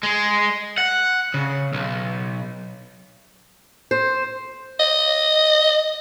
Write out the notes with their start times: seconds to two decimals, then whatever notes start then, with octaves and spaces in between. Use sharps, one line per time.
0.03 G#3
0.78 F#5
1.34 C#3
1.73 B1
3.91 C5
4.80 D#5